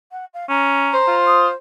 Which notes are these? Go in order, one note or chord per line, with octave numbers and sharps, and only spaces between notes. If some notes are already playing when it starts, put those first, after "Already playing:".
F#5
F5
C#4 A#5
C5
F4
D#6